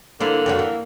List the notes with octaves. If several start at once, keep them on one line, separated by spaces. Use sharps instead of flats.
D3 A#3 E4 C5
F2 C#3 F#4
E3